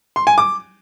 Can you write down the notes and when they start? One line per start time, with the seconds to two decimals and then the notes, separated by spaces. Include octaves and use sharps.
0.16 C6
0.27 G#5
0.38 D6